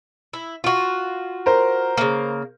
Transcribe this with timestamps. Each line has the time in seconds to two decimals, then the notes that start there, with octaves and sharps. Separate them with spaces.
0.33 E4
0.64 F4 F#4
1.46 A#4 C5
1.98 C#3 A#3